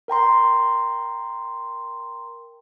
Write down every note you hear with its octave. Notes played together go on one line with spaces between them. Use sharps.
A#4 G5 A#5 C6